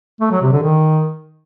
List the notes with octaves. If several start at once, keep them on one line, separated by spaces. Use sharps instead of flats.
A3
F#3
C3
D3
D#3